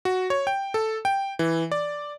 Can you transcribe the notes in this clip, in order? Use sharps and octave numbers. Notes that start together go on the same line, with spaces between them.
F#4
C#5
G5
A4
G5
E3
D5